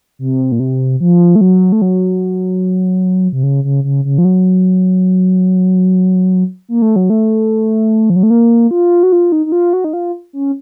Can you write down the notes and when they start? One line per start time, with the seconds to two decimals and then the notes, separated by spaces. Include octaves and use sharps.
0.19 C3
0.52 A#2
0.60 C3
1.00 F3
1.36 A3
1.41 F#3
1.72 A3
1.82 F#3
3.32 C3
3.43 C#3
3.64 C#3
3.84 C#3
4.05 C#3
4.18 F3
4.25 F#3
6.69 A#3
6.82 A3
6.96 F#3
7.10 A3
8.10 F3
8.16 F#3
8.23 A3
8.30 A#3
8.71 F4
9.03 F#4
9.12 F4
9.32 D#4
9.46 D#4
9.52 F4
9.73 F#4
9.84 D#4
9.93 F4
10.33 C#4